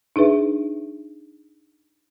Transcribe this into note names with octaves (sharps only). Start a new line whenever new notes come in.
D4 D#4 G#4 B4 E5